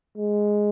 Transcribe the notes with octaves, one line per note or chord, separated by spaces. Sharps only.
G#3